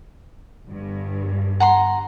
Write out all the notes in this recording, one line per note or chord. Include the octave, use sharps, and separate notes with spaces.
G1 G2
F#5 A#5 C6